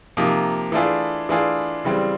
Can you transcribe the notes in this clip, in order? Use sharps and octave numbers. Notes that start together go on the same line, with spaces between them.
C3 F3 A#3 D#4
E3 A3 D4 F4 G#4
E3 A3 D4 F4 G#4
C#3 E3 G3 C4